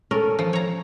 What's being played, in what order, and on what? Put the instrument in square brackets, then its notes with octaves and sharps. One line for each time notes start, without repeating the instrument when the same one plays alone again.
[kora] C#4 A4 [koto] A#4
[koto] F3
C#5 A#5